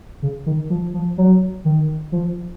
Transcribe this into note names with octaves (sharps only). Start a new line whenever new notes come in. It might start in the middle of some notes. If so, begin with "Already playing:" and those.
C#3
D#3
F3
F3
F#3
D#3
F3